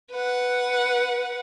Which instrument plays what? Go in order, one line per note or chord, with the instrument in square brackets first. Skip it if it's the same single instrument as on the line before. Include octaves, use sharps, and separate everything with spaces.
[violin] B4 F#5